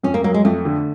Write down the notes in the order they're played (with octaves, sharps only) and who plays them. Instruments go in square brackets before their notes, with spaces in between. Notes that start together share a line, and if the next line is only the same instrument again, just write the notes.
[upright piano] F2 [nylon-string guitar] C#4
[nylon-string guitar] A#3
[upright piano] F#3 [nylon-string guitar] A#3
[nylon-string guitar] G#3
[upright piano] F2 [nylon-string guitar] A3
[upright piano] D3